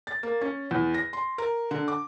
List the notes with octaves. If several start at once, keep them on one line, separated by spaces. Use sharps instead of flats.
A6
A#3
C#4
E2
A#6
C6
A#4
D3
D6